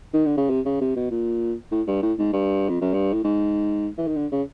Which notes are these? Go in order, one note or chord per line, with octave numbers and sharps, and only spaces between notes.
D#3
D3
C#3
C3
C#3
C3
B2
A#2
A2
G2
A2
G#2
G2
F2
F#2
G2
A2
G#2
E3
D#3
D3
C#3